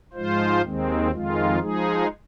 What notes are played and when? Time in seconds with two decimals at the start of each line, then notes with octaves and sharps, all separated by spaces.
0.13 G#2 F3 G#3 F4 C5
0.62 D#2 D#3 G#3 C4
1.11 F2 D#3 G#3 F4
1.60 F3 G#3 D#4 G#4